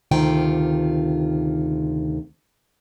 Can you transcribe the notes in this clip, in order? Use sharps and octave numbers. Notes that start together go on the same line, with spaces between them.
D2 C3 D#3 F4 G5